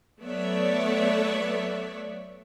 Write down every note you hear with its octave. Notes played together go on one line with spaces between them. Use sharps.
F#3 A3 B3 C#5 D5 E5